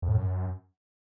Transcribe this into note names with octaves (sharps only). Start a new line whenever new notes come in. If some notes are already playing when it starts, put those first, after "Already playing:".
F2
A2
F#2